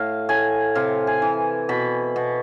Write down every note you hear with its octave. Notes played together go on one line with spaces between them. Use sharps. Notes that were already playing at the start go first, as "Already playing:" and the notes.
Already playing: A2 F5
A2 G#5
C3 F5
G#5
E3
B2 B5
B2